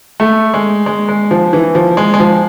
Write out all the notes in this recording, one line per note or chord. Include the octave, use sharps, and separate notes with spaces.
A3
G#3
G#3
G#3
F3
E3
F3
G#3
G#3
F3